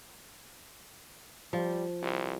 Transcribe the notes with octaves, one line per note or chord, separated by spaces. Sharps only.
F3 G3
C2